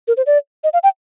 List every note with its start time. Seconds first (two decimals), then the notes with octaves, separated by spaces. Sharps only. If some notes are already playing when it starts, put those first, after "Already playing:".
0.08 A#4
0.17 C5
0.26 D5
0.64 D#5
0.73 F5
0.83 G5